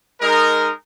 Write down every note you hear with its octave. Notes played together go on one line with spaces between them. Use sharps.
G#3 D#4 A#4